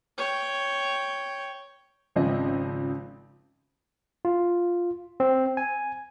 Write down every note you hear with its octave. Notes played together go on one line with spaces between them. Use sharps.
C#5 G5
G#1 C#3 F3 C4 D#5
F4
C4
G#5